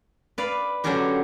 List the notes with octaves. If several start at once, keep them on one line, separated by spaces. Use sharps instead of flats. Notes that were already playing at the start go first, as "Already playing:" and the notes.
B4 D5 F5
D3 F#3 C#4 D4 F#4 G4